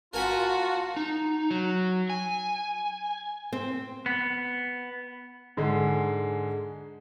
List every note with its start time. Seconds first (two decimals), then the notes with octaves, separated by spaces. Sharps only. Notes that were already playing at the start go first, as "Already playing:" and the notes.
0.14 F4 F#4 A#4 G#5 A5 B5
0.97 D#4
1.50 F#3
2.10 G#5
3.53 C4
4.06 B3
5.57 G#2 D3 G#3